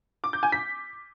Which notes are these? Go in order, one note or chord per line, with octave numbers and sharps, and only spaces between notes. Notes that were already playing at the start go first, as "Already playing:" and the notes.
D6
G6
G#5
B6